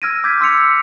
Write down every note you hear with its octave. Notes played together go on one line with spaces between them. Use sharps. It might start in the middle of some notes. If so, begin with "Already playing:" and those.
E6 F6 G#6 A#6 D7 D#7
D6 G6 G#6 A#6 B6
C6 E6 B6 C#7 F7